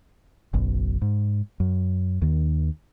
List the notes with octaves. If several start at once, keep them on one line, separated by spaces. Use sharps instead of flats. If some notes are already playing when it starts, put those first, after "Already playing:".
F#1 B1
G#2
F#2
D#2 D#3